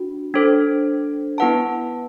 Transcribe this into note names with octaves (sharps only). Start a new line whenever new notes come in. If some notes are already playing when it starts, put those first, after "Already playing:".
Already playing: D4 F#4
D4 A4 C5
B3 E4 B4 F#5 A5